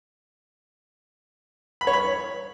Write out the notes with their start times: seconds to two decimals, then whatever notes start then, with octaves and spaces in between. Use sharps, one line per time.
1.81 B5
1.87 C#5
1.93 B5